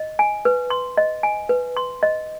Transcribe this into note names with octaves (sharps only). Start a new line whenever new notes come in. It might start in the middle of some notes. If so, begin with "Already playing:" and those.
Already playing: D#5
G#5
B4
C6
D#5
G#5
B4
C6
D#5